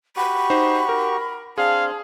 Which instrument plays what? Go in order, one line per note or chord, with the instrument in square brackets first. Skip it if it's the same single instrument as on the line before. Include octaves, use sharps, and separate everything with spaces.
[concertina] F#4 G4 C#6 [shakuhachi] B5
[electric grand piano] D#4 C5
A#4
[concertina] C4 D4 C6 [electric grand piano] G#4 [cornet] F5 [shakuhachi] A5